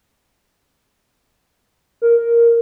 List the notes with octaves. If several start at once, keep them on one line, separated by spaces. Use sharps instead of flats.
A#4